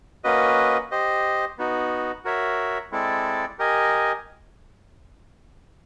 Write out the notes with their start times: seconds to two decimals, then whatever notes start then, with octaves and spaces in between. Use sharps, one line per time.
0.24 A#3 C#4 F#4 B4 D#5
0.91 G4 C5 D#5
1.58 B3 D#4 F#4
2.25 F#4 A#4 C#5 E5
2.92 G#3 C4 E4 A4 D5
3.59 G4 A#4 D#5 G#5